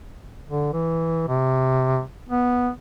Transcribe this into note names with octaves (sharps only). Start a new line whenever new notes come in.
D3
E3
C3
B3